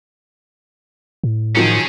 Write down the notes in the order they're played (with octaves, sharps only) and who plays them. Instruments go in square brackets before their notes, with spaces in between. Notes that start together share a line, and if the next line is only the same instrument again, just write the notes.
[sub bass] A2
[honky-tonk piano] D#3 F3 F#3 [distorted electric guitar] C#4 G#4